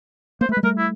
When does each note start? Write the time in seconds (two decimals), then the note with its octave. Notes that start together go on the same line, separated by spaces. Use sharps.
0.41 A#3 C5
0.49 A3
0.52 B4
0.57 G#3
0.63 G3 A3 A#4
0.78 E4